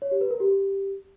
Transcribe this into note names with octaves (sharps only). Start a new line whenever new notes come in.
C#5
G4
B4
A#4
G4